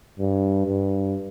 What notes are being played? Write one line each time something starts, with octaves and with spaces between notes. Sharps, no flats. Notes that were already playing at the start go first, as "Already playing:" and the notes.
G2
G2